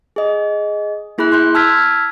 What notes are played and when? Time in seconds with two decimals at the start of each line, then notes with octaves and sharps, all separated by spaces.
0.16 G#4 D#5
1.18 A#3 E4 G#4 B5 F#6
1.32 C6 F#6 G6
1.55 A5 E6 F6 G#6 B6